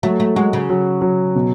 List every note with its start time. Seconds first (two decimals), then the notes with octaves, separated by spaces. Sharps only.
0.03 F#3 A3
0.20 A3
0.36 G#3 F#4
0.53 C#3
0.70 F#3
1.02 F#3
1.35 B2